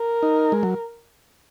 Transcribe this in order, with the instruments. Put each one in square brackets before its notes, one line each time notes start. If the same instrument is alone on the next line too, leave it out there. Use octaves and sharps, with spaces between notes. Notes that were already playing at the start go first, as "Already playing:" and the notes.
Already playing: [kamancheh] A#4
[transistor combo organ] D#4
G#3
F#3